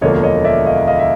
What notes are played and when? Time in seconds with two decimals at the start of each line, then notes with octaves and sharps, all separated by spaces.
0.01 E1 D2 D3 F3 A#3 C#5 D#5
0.23 C#5 D#5
0.44 D5 E5
0.66 D#5 F5
0.87 D#5 F5
0.99 E5